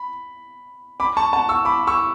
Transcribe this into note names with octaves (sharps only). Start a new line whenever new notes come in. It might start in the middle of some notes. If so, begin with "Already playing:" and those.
Already playing: B5
B5 D6
A5 C#6
F#5 A5
C#6 E6
B5 D6
C#6 E6